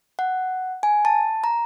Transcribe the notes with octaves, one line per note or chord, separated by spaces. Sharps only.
F#5
G#5
A5
A#5